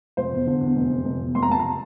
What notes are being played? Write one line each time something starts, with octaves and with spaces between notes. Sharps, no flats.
F1 C5
E2
D3
E2
F1
F1
F1
E2
F1 C6
A#5
F1 A5
A#5